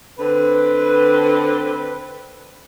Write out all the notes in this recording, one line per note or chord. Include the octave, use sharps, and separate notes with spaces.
D3 C4 B4